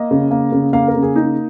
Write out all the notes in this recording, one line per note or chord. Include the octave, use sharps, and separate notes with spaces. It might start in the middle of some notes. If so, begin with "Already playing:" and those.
Already playing: A#3 D#5
C#3
A#3
C#3
A#3 F5
A#4
C#3
G#4
A#3 D#4